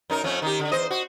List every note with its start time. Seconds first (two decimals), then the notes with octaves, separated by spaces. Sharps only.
0.10 F#2 D#4 A#4
0.24 F2 A3 C#4
0.42 D#3 D#4 G4
0.59 D3
0.72 E2 C5 D#5
0.91 F#4 C5